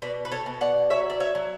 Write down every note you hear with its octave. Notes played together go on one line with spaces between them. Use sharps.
B2 B4 D5
B4
A4 C#5
B2
D5 F#5
F#3 C#5 E5
D5
C#5 E5
F#3